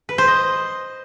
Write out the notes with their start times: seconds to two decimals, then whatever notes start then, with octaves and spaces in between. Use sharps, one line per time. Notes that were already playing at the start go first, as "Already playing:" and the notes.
0.09 B4
0.18 C5
0.28 D#5